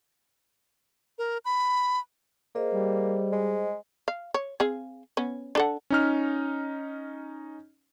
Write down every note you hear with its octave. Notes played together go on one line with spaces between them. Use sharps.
A#4
B5
A#3 G#4 C5 D#5
G3
G#3
F5
C#5
C4 G#4 F5
B3 C#4
D4 A4 F#5
C#4 D#4 F6